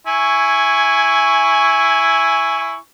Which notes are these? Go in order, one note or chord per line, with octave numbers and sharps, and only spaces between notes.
E4 G#5 C#6